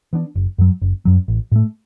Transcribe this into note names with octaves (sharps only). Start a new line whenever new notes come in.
E3 B3 D4
F#1
F#2 F#3
F#1
F#2 F#3
A1
A2 A3